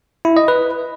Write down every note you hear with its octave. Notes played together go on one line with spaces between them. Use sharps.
E4
D#5
B4